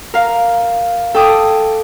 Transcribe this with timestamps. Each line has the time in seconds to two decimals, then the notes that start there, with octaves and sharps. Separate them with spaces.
0.14 A#4 F5
1.14 A4 G5 D6 D#6